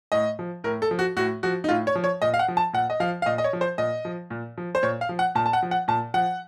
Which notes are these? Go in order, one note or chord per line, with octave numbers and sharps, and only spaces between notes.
A2 D#5
F3
A2 A#4
A4
F3
F#4
A2 F#4
F3 F#4
D#4
A2 F4
C#5
F3
C#5
A#2 D#5
F5
F#5
F3
A5
A#2 F#5
D#5
F3 F5
F5
A#2 D#5
D#5
C#5
F3
C5
A#2 D#5
F3
A#2
F3
C5
A#2 C#5
F5
F3
F#5
A#2 A5
A5
F#5
F3
F#5
A#2 A5
F3 F#5